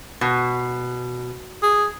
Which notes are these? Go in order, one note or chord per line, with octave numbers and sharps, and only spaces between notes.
B2
G#4